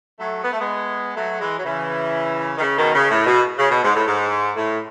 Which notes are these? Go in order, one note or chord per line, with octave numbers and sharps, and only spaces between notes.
F#3 A3
B3
A3
G#3 B3
F#3 A3
E3 G#3
F#3
C#3 E3
D#3
C#3
B2 D#3
C#3
A2
B2
C#3
B2
G#2
A2
G#2
A2